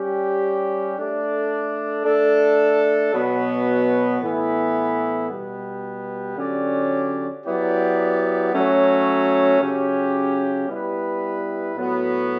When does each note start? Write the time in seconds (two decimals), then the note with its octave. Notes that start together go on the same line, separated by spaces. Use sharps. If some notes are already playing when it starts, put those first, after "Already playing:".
Already playing: G3 C#4 G4
0.98 A3 D4 A4 D5
2.05 A3 D4 A4
3.14 B2 F#3 B3
4.21 A2 E3 B3 E4
5.29 B2 G3 B3
6.37 D3 F#3 C#4 G4 D5
7.44 F#3 B3 E4 G4 D5
8.52 F#3 A3 C#4 F#4 C#5
9.60 C#3 F#3 C#4 G4
10.68 G3 B3 E4 B4
11.75 A2 F#3 B3 F#4